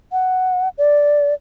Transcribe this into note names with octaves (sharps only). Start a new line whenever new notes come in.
F#5
D5